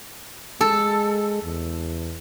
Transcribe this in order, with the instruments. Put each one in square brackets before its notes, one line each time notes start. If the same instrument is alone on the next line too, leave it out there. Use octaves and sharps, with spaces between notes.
[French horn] G#3 [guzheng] A4
[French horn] E2